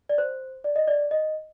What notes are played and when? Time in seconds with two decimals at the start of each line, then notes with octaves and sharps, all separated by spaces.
0.09 D5
0.18 C5
0.64 D5
0.76 D#5
0.87 D5
1.11 D#5